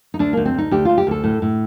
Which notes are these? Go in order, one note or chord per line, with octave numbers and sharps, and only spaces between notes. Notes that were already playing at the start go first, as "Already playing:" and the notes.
D#4
D2 D4
D2 A#3
C4
D2 D#4
D2 G4
D2 F4
G4
D2 A4
A2
A2